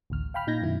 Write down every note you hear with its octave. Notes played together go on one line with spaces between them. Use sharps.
A1 D2 F6
F5 G5 B5 F6
A#2 D#4 G6 G#6 A#6
F#2 B2 D#3 E4